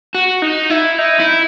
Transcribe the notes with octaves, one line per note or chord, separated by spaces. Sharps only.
F#4
D#4
E4
D#4
E4